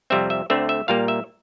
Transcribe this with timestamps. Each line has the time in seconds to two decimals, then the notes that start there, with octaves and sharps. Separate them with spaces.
0.10 F2 C3 G3 C4 E5
0.30 E5
0.50 D2 D3 A3 C4 E5
0.69 E5
0.88 A#2 G3 A#3 F5
1.08 E5